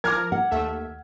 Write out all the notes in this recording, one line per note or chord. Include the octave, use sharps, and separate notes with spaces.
F3 A#4 D6 F6 G#6
F#5
D#2 A3 E5